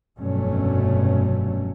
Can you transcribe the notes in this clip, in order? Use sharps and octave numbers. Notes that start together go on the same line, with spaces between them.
F1 G2 B2 F#3 A3 C#4